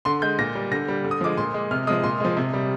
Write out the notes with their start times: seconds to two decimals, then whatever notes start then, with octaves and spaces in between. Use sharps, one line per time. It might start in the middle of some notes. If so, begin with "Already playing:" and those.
0.05 D3 C6
0.22 G#3 G6
0.39 A#2 A#6
0.55 G3
0.72 D3 A#6
0.88 G3
1.05 D3
1.11 D#6
1.21 F3 G#3 D6
1.37 A#2 C6
1.54 G#3
1.71 C3 F6
1.87 G#3 D#6
1.90 F3
2.03 A#2 C6
2.20 F3 G#3
2.37 C3
2.53 G3